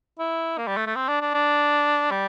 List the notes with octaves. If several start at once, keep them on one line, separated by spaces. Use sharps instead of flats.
E4
A#3
G3
A3
A3
C4
D4
D4
D4
G3